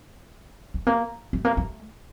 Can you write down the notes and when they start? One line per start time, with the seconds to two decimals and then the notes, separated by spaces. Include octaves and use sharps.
0.74 A3
0.87 A#3
1.33 A3
1.45 A#3
1.57 A3